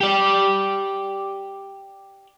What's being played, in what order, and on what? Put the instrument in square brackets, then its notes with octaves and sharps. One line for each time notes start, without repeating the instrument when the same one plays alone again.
[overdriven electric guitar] G4 D5